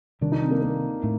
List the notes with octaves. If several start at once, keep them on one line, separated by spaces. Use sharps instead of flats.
C3 D#3 G3 D4
D#4
C4
A#3
A#3
A2 A3 D4